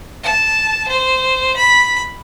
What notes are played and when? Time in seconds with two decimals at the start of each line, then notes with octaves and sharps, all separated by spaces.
0.23 A5
0.88 C5
1.57 B5